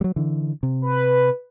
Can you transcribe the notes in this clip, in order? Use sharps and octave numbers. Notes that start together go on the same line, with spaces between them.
F#3 G3
D3 E3
C3
B4